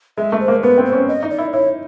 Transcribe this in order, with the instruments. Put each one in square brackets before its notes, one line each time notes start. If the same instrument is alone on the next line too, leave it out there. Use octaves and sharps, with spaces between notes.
[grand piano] G#3 [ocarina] E5
[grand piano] A3
[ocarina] C5
[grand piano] A#3
[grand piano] B3 [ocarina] B4
[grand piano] C4
[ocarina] C5
[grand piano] C#4
[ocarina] D#5
[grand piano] D#4
[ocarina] D5
[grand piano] E4
[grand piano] E4 [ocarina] C#5